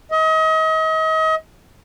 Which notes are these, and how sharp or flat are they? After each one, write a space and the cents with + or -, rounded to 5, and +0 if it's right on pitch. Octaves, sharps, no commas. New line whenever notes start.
D#5 +35